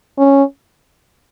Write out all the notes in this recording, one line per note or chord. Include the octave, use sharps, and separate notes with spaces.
C#4